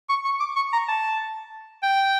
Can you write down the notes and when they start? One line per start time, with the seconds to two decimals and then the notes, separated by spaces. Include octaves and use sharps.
0.09 C#6
0.25 C#6
0.40 D6
0.56 C#6
0.73 A#5
0.88 A5
1.83 G5